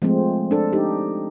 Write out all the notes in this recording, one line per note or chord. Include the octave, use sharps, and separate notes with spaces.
F3 G#3 A3 C4
D4 A4
D#4 G4